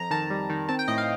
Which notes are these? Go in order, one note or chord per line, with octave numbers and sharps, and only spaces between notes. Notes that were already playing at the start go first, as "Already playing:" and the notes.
Already playing: F2 A#5
D#3 A5
G3
D#3
C4 A5
G5
A2 D#5
F5